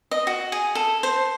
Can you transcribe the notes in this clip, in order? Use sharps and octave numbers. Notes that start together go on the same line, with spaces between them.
D#5
F#4
G#4
A4
C5